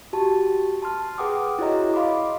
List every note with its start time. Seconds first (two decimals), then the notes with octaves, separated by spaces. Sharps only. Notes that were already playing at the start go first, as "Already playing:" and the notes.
0.13 F#4 G4 A5
0.82 A5 C6 F6
1.18 G#4 B4 F#5 G5 D6 D#6
1.59 E4 F#4 G#4 C#5 D#5 A#5
1.94 D#5 F5 B5 C6 D6